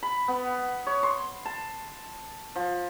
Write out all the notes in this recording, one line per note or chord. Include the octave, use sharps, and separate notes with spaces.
B5
B3
C#5
C6
A5
F3